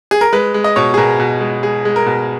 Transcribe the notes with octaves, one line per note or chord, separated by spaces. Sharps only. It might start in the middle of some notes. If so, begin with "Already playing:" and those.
G#4
A#4
G#3 B4
G#3
D#5
B2 C#5
G#4
B2 A#4
B2
G#3
G#3 G#4
G#3
A#4
B2